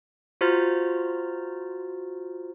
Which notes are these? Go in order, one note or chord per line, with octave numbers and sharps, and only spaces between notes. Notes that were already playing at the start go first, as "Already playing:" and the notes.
F4 F#4 C5 A#5 F6 A6